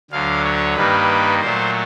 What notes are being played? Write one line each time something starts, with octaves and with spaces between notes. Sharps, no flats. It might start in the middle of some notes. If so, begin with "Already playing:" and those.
D2 D3 F#3 F5
C#5
G2 D#3 G3 A#3 B4
A#2 F#3 A3 C5